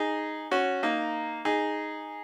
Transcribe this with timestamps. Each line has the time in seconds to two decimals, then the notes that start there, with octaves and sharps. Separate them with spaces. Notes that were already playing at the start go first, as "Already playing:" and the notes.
Already playing: D#4 G#4
0.51 C#4 F#4
0.83 A#3 D#4
1.45 D#4 G#4